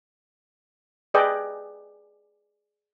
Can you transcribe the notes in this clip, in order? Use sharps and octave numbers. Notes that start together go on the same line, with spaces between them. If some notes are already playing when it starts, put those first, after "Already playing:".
G#4 B4 D5 D#5 G5